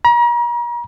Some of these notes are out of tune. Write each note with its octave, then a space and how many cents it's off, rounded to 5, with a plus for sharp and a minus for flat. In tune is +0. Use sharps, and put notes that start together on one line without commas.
A#5 +40